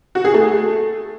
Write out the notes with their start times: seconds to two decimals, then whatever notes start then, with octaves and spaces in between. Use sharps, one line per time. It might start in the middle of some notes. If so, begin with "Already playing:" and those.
0.15 F#4
0.25 G#4
0.34 A3